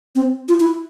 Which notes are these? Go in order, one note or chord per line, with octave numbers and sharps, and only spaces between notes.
C4
F4
E4